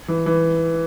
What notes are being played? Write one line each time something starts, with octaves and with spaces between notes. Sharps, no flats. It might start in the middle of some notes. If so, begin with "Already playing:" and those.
E3
E3